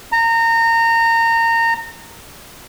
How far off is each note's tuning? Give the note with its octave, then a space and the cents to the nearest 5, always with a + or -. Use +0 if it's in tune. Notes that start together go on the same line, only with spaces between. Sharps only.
A#5 -25